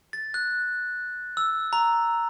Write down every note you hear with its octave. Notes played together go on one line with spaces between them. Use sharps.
A6
F#6
E6
A#5